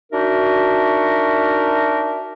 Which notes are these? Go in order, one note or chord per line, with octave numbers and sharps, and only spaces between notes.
D4 D#4 F#4 A#4 E5